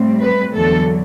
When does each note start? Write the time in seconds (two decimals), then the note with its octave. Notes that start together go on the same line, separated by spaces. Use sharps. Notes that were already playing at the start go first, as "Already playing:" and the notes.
Already playing: A2 G3 C4
0.21 B4
0.54 E2 D3 F#3 A4